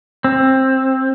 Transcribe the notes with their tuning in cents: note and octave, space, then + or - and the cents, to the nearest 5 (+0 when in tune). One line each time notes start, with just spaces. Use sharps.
C4 +15